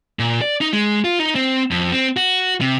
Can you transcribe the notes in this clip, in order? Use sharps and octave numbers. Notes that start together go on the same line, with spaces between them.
A#2
D5
D#4
G#3
F4
D#4
C4
F2
C4
F#4
C3